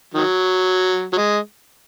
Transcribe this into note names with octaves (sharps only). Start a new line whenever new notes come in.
D#3 F#3
F#3
G#3